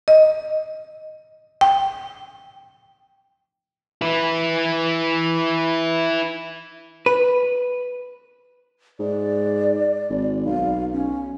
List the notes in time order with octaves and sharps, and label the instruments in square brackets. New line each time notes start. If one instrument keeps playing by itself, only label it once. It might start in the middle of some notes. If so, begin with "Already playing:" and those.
[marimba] D#5
G5
[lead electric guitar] E4 B4
[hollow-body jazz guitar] B4
[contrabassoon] G#2 [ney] D5
[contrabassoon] G#1
[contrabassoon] B1 [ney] F5
[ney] C#4